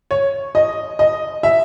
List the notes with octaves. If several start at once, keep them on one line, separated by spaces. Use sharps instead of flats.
C#5
D#5
D#5
E5